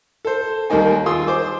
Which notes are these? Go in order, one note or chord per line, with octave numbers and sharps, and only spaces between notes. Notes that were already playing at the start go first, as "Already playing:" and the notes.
A4 C5
D#2 G3 A#3 D#4 G#5
F4 G#4 C6 D#6 E6
C5 D6